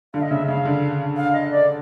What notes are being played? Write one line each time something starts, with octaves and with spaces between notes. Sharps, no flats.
D3 F5
D#5
C#3 E5
C#3 F5
D3
F5
D#5
D5